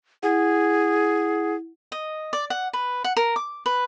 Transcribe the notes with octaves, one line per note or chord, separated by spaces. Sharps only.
E4 G#4 F#5
D#5
D5
F#5
B4
F#5
A#4
D6
B4